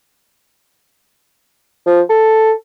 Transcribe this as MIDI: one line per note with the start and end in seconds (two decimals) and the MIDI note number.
1.86 2.00 53
2.09 2.52 69